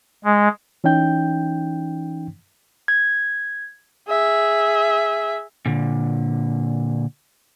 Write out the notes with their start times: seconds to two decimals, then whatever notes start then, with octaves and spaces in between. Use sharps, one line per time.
0.24 G#3
0.84 E3 C#4 D#4 G5 G6
2.88 G#6
4.08 G#4 E5
5.66 A#2 D3